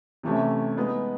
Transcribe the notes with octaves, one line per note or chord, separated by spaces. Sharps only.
C3 E3 A3 C#4 E4
G#3 B3 D#4